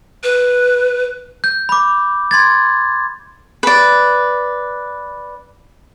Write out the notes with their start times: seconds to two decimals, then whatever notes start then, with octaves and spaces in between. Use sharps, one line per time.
0.23 B4
1.44 G6
1.69 B5 D6
2.31 C6 G#6 A6
3.63 B4 D5